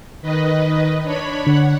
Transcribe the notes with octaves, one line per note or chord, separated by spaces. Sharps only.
D#3 B4 D#5
D4 C#5 B5
D3 F#5